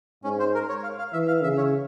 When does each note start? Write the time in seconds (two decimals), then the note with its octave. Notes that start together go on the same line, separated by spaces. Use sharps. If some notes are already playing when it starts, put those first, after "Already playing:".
0.24 G#2 C#4
0.39 C5
0.54 A#4
0.69 C#5
0.83 F5
0.99 F5
1.13 E3 E5
1.28 F5
1.43 C#3 E5
1.58 C#5